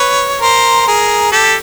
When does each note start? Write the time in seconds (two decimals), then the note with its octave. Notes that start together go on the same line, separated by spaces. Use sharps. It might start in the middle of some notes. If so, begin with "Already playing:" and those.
Already playing: B4 C#5
0.41 A#4 C5
0.87 G#4 A#4
1.32 G4 A4